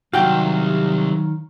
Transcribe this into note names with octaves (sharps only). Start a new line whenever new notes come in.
C2 D#3 F#3 F#4 F5 G5